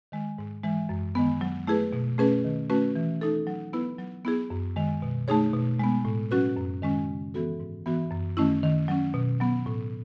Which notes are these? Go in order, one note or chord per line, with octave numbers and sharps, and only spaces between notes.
D#3 G#3
G#2
E3 G#3
F#2
D#3 G#3 B3
F#3
A3 E4 G#4 B4
B2
A3 C#4 G#4 B4
D#3
A3 C#4 F#4 B4
E3
A3 D#4 A4
F#3
B3 E4 B4
F#3
B3 E4 G#4
F#2
D#3 G#3
B2
A3 D#4 G#4 C#5
B2
G#3 B3
A2
F#3 C#4 F#4 B4
F#2
D#3 G#3 C#4
C#3
E3 B3 F#4 A4
G#2
E3 B3 F#4
F#2
D#3 A3 C#4 E4
D#3
F#3 C#4
B2
F#3 B3
A2